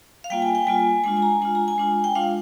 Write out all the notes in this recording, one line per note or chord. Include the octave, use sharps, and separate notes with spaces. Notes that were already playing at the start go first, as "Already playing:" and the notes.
F5
G3 A#3 F4 G5
G#5
G5
G3 A#3 F4 G#5
G#3 D4 F4 G#5
G#5
A#5
G#3 D4 F4 G#5
A#5
G#5
G#3 D4 F4
G5
G#3 D4 F4 F5